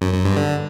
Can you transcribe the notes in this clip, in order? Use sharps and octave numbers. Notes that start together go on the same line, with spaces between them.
F#2
F#2
G2
D3